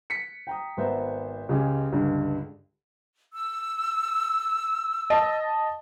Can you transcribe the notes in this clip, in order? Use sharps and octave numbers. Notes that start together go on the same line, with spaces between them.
B6 C#7
G5 A#5 D#6
G#1 B3 C5 E5 A#5
C#2 C#3 G#3 G4 G#5
C#2 G2 D3
E6
D#5 A5